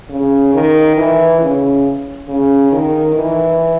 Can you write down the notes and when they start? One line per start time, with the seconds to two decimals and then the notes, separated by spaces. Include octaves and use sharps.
0.09 C#3
0.53 D#3
0.97 E3
1.41 C#3
2.28 C#3
2.72 D#3
3.16 E3